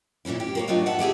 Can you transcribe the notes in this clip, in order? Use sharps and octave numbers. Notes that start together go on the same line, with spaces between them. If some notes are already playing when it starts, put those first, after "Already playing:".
F#2 A#2 E3 C#4 E4
G4
A#3 A#4 C#5
F#3 A3 D4 D#4 F4 F#4
E5 F#5 A5
E4 G4 G#4 E5